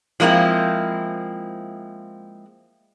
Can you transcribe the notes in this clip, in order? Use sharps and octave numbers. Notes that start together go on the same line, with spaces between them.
F3 G#3 A#3 C4 E4